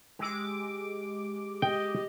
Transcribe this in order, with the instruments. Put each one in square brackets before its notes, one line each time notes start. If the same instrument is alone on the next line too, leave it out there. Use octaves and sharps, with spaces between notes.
[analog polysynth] G#3 D6 [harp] G4 E6
[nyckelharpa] G4 D#5 [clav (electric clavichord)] G5